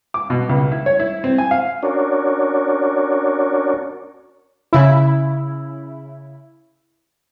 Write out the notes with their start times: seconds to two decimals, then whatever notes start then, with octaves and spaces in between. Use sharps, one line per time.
0.14 D6
0.30 B2
0.49 C#2
0.72 E4
0.86 C#5
1.00 E4
1.24 C4
1.38 G#5
1.51 F5
1.83 C#4 D4 F#4 A#4 C#5 D5
4.73 C#3 E4